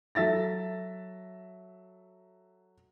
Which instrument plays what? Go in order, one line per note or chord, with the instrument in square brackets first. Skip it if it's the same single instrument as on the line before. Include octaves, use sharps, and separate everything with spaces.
[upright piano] F#3 A4 E5 A6 A#6